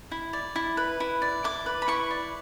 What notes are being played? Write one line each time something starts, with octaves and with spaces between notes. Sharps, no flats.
E4
D5
E4
B4
E4
D5
E4 D6
B4
B5
E4 C#6
D5